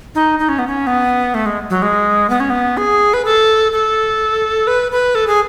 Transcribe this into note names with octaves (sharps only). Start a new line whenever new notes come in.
D#4
D#4
C#4
B3
C#4
B3
A3
G#3
F#3
G#3
B3
C#4
B3
G#4
B4
A4
A4
B4
B4
A4
G#4